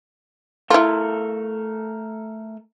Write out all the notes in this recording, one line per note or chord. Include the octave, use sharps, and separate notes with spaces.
A3 E4 F4 A4 A#4